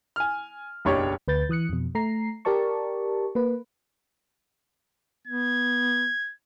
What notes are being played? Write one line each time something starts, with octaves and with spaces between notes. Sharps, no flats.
G#5 F6
F#1 B1 D4 G4 C#5 C#6
D2 B4 G6 A6
E3 D#6 F#6 C#7
F2 B2
A3 A#5 C7
G4 A#4 D5 A5 C#6
A#3 B4
B3 G#6